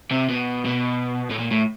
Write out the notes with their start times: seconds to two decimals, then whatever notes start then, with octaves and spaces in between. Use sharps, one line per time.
0.11 C3
0.29 B2
0.66 B2
1.30 A2
1.39 A#2
1.51 A2